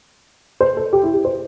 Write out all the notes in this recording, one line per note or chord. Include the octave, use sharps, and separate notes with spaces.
C5
A4
G4
E4
G4
C5